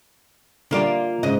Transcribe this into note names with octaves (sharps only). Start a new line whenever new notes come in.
D3 G3 A#3 F4 D5
G#2 C#3 D#5